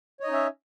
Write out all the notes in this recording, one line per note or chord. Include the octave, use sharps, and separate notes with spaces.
C#4 D#4 C#5 D#5 E5